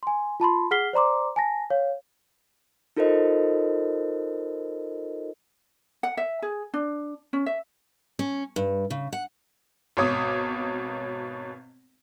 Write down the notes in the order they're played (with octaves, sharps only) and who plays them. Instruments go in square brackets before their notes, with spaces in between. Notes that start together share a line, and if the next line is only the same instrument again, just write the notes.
[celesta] G#5 C6
F4 A5 B5 C6
G#4 F#5 F6 B6 C7 G7
C5 D5 A#5 C6 D6
G#5 A5 A#6
C#5 F5
[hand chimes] D#4 F4 A4 A#4 C5 D#5
[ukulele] F#5
E5
G#4
D4
C#4
E5
[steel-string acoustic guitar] C#4
G2
C#3
F#5
[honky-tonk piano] G#1 B2 C#5 D6 D#6